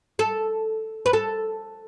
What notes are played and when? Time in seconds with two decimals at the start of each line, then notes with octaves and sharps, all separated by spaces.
0.19 A4
1.06 B4
1.13 A4